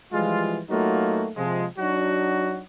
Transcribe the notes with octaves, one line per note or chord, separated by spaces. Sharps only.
E3 F3 G3 G#3 F4
F#3 A3 A#3 D#4 F4 F#4
C3 F3 G#3
F#3 D4 D#4 F#4